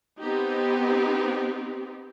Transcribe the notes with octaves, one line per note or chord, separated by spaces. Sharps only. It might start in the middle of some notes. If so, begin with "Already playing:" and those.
B3 C4 D#4 G4